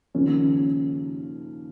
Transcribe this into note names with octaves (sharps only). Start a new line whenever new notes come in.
D#2 C#3 F3 A#3 C#4